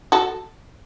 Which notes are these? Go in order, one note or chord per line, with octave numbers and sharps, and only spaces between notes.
F#4 A4